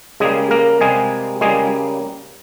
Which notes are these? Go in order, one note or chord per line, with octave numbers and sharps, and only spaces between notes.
C#3 G3 G#3 A#3 G#4
A#3 A#4
C3 G3 G#3 A#3 G#4
C#3 G3 G#3 A#3 G#4